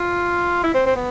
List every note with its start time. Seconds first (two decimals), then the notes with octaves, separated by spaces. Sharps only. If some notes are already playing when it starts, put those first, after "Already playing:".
Already playing: F4
0.63 E4
0.74 C4
0.86 C4
0.96 B3